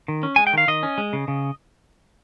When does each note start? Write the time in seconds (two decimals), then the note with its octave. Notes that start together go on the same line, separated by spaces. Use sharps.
0.08 D#3
0.23 C#4
0.36 G#3 G#5
0.47 G5
0.53 D#3 F5
0.68 D#3 D#5
0.83 C#4
0.98 G#3
1.13 C#3
1.28 C#3